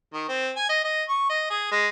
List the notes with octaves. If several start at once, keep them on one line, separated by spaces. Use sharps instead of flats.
D#3
C4
G#5
D#5
D#5
C#6
D#5
G#4
G#3